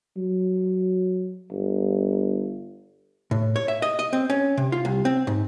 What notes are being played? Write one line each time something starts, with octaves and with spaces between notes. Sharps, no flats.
F#3
G1
A2
C#5
E5
D#5
D#5
C4
C#4
C3
F4
C2
C4
G#2